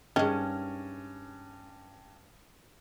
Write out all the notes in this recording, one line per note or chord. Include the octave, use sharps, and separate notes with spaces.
G2 D#3 G#3 C#4